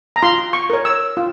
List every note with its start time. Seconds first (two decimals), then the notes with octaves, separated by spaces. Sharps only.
0.16 A#5
0.22 F4 C6
0.53 C#6
0.70 A#4 C#5
0.85 E6
1.17 F4